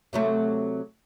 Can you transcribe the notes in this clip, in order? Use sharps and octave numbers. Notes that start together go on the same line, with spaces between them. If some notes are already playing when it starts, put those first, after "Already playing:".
C3 F#3 A3